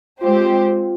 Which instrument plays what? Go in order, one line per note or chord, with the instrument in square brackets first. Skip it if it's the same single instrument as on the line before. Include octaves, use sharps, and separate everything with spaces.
[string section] G#3 C4 G4 C5 [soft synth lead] F4